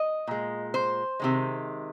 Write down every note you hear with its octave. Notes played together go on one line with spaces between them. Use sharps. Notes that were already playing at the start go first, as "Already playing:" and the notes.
Already playing: D#5
A#2 G#3
C5
C3 D#3 G#3